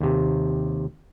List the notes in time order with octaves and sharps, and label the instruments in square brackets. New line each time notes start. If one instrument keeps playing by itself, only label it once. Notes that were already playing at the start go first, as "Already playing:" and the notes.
[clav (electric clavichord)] D#2 C3